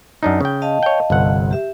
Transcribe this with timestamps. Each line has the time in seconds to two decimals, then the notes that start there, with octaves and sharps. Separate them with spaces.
0.23 F#2 D4 D#4
0.41 C#3 G5
0.62 D#5 F5 A5
0.83 C#5 G5
1.10 G1 C2 F#5
1.51 G4 E5